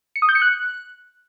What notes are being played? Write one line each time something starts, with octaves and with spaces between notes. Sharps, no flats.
C#7
D#6
G6
C#7
F#6